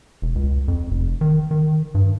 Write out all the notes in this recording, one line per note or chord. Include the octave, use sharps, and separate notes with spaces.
E1
C#2
F2
F1
D#3
D#3
G2